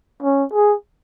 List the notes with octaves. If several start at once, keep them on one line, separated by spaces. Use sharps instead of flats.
C#4
G#4